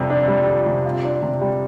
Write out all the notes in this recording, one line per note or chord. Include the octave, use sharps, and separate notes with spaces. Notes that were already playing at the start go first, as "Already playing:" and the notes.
Already playing: F2 C3 G3
D4
G3
F2
C3
F4
D4
C3
G3